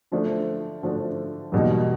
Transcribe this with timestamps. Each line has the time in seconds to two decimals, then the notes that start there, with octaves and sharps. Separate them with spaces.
0.12 D3 F3 A3 D4
0.83 D3 F3 A3 D4
1.52 E2 B2 G3 A#3 D#4